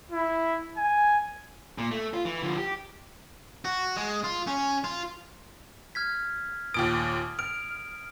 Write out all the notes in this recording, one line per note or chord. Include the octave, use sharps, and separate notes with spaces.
E4
G#5
A#2
A3
F4
E3
D3 F3
G4
F#4
G#3
F4
C#4
F4
F6 G#6 B6
D#2 A#2 D#6 D7
F6 D7